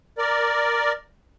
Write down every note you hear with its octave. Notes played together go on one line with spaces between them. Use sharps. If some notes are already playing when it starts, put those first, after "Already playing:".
A#4 D5